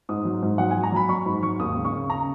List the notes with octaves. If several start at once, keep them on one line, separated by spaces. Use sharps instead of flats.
G#2 D#6
F#3
G#2
F#3 F#5
F#3 G#5
A#5
F#3 B5
F#3 C#6
G#2 B5
F#3 C#6
D#2 D#6
C#3
C#6
C#3
C#3 A#5